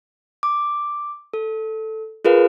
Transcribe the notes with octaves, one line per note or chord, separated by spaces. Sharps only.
D6
A4
F4 G#4 A#4 B4 F5